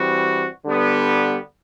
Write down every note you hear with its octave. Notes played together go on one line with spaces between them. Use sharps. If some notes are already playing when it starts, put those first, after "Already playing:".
Already playing: E3 G3 C4 F#4
D3 G3 B3